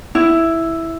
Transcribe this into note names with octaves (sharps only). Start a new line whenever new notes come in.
E4